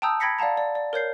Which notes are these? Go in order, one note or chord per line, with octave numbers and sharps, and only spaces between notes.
G5 A5 A#5 D#6 E6 G6
G5 B5 G#6 A#6 B6 C#7
D5 F5 F#5 A5 A#5
D5
D5
A#4 C#5 G6 C7